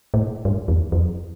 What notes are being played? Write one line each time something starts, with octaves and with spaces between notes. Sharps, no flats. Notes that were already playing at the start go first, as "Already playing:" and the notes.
A2
G2
E2
F2